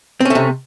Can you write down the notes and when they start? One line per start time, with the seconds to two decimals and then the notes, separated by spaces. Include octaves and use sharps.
0.20 C4
0.25 C#4
0.30 A3
0.35 C3